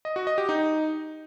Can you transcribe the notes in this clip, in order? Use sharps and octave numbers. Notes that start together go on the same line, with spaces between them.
D#5
F#4
D#5
G4
D#4